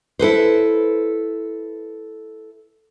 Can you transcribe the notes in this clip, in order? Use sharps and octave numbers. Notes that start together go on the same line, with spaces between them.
E4 A4 B4 C5